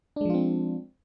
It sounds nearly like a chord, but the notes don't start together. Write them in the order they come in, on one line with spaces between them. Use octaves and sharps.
D4 G#3 F3 F4 C4